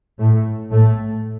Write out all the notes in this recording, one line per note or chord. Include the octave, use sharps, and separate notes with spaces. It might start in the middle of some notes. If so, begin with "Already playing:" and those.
A2 A3
A2 A3